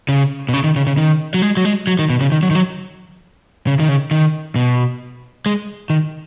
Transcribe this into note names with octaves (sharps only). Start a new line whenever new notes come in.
C#3
B2
C#3
D#3
C#3
C#3
D#3
F#3
G#3
F#3
G#3
F#3
D#3
B2
C#3
D#3
F#3
D#3
F#3
C#3
D#3
C#3
D#3
B2
G#3
D#3